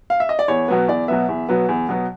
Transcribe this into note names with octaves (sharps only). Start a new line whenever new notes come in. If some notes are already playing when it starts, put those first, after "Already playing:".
F5
E5
D#5
D5
E2 C#5
B2 F#3 B3
E2 D5
B2 F#3 B3 E5
E2
B2 F#3 B3
E2
B2 F#3 B3